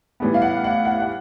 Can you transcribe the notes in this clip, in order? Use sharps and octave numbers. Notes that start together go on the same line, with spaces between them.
A2 E3 G3 B3
F5
F#5
F#5
F#5
F#5